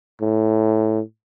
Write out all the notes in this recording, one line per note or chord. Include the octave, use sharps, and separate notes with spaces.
A2